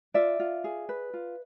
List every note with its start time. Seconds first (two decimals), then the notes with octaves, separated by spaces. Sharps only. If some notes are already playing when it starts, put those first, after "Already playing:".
0.14 F4 D5 E5
0.40 F4
0.64 G#4
0.89 B4
1.14 F4